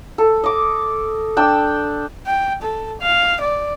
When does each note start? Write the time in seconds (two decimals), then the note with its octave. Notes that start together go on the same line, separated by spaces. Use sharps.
0.18 A4
0.44 D#5 D6
1.37 D4 G5 E6
2.26 G5
2.62 A4
3.01 F5
3.41 D5